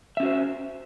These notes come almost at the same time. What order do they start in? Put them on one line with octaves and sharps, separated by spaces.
E5 C#4 F#4 C5